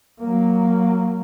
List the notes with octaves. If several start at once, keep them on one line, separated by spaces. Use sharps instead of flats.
F#3 A#3